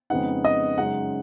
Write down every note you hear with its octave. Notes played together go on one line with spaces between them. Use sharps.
F2 C#3 G#3 B3 D#4 F#5
D#5
F#2 C#3 G#3 D#4 F#5